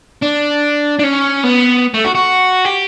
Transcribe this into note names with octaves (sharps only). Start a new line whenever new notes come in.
D4
D4
C#4
B3
A3
F#4
F#4
G4